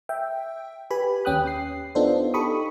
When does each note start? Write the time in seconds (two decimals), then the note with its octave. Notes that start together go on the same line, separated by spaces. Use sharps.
0.09 E5 G5
0.90 G4 B4 G#5 B5
1.25 D#2 C#4 G5 D#6 F#6
1.47 C7
1.95 B3 D4 D#4 F4 A4 C5
2.34 D#4 G4 A4 B5 C#6 D#6